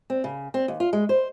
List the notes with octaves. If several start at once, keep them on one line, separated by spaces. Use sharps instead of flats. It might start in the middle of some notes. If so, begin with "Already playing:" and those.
C4
C#3
C4
D#2
F4
G#3
C5